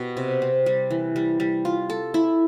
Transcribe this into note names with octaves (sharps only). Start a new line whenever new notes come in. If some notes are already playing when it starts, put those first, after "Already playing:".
Already playing: B2 G4
C3
C4
G3
E3
G3
G3
F4
A4
E4